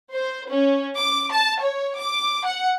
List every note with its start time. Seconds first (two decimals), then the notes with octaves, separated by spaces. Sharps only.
0.13 C5
0.50 C#4
0.97 D6
1.32 A5
1.62 C#5
1.99 D6
2.45 F#5